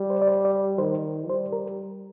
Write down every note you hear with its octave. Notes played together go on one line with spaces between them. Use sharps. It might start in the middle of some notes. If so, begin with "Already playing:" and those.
Already playing: G3
C5
D5
C5
D5
D#3 C5
G3 C5
A#4